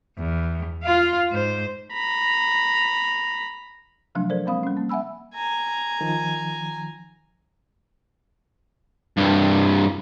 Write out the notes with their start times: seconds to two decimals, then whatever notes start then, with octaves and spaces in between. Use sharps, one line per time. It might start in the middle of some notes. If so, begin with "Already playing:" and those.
0.18 E2
0.84 F4 F5
1.31 G#2 C5
1.93 A#5 B5
4.15 C3 F3 F#3 A3 D4
4.30 A4 A#4 C5 D5
4.46 G#3 A#3 C4 F5 B5 D#6
4.63 G3 C#4
4.77 A#3
4.89 E5 F#5 G#5 B5 E6
5.35 G#5 A#5
6.01 D#3 F3
9.18 C2 G2